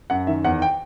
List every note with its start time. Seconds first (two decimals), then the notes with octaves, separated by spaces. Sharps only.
0.10 F#2 F#5
0.27 D#3 E5
0.45 E2 F#5
0.62 G5